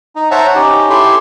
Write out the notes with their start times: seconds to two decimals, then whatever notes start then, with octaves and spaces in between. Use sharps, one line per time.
0.16 D#4
0.31 C5 C#5 E5 F#5 A5 A#5
0.55 C#4 D#4 G4
0.90 E4 G4 A4 E5 C6